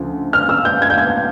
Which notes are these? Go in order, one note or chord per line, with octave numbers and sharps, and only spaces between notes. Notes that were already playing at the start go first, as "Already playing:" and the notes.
Already playing: D2 C#3 F3
F6
E6
G6
G#6
G6
G#6